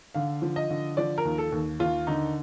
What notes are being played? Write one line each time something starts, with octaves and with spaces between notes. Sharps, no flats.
D3 F5
F3
D#5
D3
F3 D5
A#4
D#2
A4
D#2
D#2 F4
D3 D#4